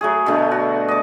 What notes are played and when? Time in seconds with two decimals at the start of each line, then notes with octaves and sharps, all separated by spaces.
0.01 F#3 A3 G#4
0.26 B2 D3 A3
0.51 F#4
0.88 D#5 D6